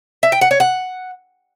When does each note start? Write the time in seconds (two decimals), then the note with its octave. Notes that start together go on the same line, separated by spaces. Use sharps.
0.23 E5
0.32 G5
0.41 F#5
0.51 C#5
0.60 F#5